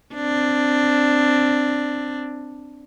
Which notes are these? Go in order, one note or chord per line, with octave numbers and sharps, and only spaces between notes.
C4 D4